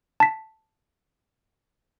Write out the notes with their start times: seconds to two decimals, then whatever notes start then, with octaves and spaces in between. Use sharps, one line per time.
0.20 A5 B6